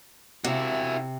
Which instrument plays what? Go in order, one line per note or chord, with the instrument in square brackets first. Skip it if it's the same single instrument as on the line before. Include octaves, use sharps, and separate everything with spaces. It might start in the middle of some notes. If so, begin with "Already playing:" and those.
[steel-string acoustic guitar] C3 [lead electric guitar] E4 F#4